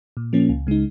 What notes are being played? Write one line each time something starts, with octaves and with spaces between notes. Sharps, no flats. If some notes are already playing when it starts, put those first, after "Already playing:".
A#2
F3 A#3 C#4
C#2
C#3 G#3 D#4